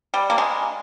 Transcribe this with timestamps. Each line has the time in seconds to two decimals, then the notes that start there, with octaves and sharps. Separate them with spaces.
0.14 G3
0.30 A#3
0.38 G#3